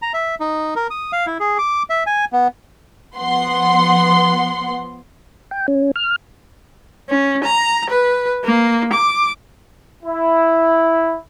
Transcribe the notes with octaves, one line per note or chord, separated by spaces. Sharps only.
A#5
E5
D#4
A#4
D#6
F5
E4
G#4
D6
E5
G#5
B3
F3 B3 F#5 C6
G5
C#4
F6
C#4
A#5
B4
A#3
D6
E4